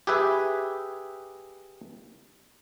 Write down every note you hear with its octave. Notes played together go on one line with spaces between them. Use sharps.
G4 G#4 B4 E5 G#5